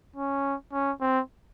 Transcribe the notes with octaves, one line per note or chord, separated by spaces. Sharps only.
C#4
C#4
C4